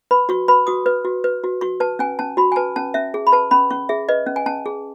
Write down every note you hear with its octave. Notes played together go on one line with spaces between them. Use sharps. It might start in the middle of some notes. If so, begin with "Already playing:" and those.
B4 B5
F#4 C#6
B4 B5
F#4 D#6
B4
F#4
B4
F#4
F#4 C#6
B4 A5
C#4 G#5
C#4 A5
F#4 B5
G#5
B4 A5
C#4 A5
C#4 E5
G#4
B5
B4 A5
C#4 B5
C#4 C#6
G#4 E5
B4 D#5
C#4
G#5
C#4 A5
G#4